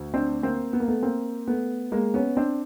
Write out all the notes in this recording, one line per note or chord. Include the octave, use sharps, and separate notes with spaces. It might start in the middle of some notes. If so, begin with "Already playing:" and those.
Already playing: D2
C4 D4
A#3 C4
B3
A#3
A3 B3
A#3 C4
A3 B3
G#3 A#3
B3 C#4
C4 D4